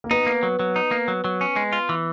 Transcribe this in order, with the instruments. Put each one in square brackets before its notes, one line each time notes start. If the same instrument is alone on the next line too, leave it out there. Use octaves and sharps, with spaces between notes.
[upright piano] A#3
[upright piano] B3 [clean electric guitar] D#4
[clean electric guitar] A#3
F#3
F#3
D#4
A#3
F#3
F#3
C#4
G#3
F4
E3